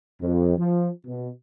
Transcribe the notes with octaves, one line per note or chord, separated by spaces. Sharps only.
F2
F3
B2